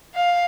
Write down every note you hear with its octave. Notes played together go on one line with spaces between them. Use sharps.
F5